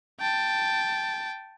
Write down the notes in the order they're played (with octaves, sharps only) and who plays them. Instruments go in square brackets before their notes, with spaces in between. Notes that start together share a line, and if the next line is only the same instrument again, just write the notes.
[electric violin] G5 A5